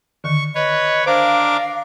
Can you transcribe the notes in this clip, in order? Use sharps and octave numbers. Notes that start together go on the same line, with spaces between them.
D3 D#3 C#6
B4 C#5 D#5
D4 A#4 C5 F5 D6